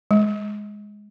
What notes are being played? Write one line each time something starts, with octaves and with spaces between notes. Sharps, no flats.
G#3